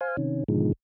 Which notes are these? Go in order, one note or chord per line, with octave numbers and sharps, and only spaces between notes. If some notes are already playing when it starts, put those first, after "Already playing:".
C5 F5 G#5
C3 D#3 C#4
G#2 B2 D3 D#3 F3 G#3